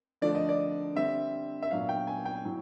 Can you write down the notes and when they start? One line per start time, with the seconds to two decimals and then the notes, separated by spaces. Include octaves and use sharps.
0.21 D3 F3 A3 D4 D5
0.35 D#5
0.49 D5
0.96 D3 G3 C4 E5
1.62 E5
1.71 A#2 F#3 B3 D4 F5
1.89 G5
2.07 G#5
2.25 G5
2.45 A2 F#3